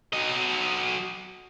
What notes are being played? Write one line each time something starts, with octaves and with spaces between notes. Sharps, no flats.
F#3 D#5